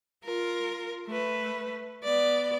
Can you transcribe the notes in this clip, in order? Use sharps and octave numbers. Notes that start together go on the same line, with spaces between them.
F4 A#4
A3 B4
B3 D5